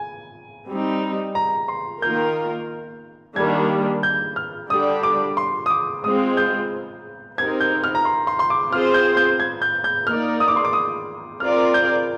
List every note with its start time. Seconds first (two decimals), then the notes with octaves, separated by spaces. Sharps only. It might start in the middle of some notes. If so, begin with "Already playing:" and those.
Already playing: G#5
0.67 G3 C4 D#4
1.35 A#5
1.68 C6
2.02 D#3 A#3 F4 A#4 G6
3.36 D#3 G3 A#3 D4 G#6
4.03 G6
4.36 F6
4.70 D3 G3 D4 G4 D5 D#6
5.03 D6
5.37 C6
5.66 D#6
5.70 D6
6.04 G#3 C4 F4 D#6
6.37 G6
7.38 C4 D#4 G4 A#4 G#6
7.61 G6
7.84 F6
7.95 A#5
8.05 C6
8.27 C6
8.39 C6
8.50 D6
8.72 C4 F4 G#4 C5 F6
8.94 G6
9.17 G6
9.40 G#6
9.62 G6
9.84 G6
10.07 A#3 D#4 A#4 D5 F6
10.40 D#6
10.48 D6
10.56 C6
10.65 D6
10.73 D#6
11.40 C4 F4 A#4 D5 F6
11.74 G6